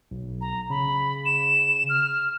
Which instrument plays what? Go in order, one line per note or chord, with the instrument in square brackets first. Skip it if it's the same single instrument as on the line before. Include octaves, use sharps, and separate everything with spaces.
[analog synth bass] B1
[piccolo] A#5
[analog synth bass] C#3 [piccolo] B5
[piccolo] E7
F6